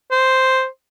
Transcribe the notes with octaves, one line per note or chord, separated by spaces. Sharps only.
C5